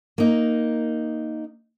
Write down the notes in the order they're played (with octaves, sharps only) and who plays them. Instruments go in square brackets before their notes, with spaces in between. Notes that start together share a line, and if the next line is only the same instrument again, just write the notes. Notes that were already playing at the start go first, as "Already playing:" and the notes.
[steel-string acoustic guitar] A#3 D#4